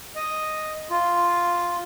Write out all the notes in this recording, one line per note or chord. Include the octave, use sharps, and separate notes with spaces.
D#5
F4